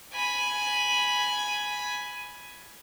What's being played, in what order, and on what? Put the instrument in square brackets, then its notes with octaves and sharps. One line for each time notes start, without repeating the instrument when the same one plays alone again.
[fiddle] G#5 B5